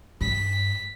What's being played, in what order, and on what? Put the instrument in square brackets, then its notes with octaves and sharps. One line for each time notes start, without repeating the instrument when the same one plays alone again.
[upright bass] G2 [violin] B6